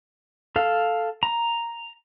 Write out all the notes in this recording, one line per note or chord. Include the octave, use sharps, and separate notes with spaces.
A4 F5
A#5